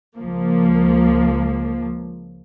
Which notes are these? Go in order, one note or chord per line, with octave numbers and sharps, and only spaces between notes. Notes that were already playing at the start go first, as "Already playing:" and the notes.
C#2 F3 A#3